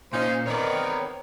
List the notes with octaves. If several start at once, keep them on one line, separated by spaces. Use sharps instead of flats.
A#2 C#4 D#4 F4 C5 C6
D#3 B3 C4 A#4 C#5 D5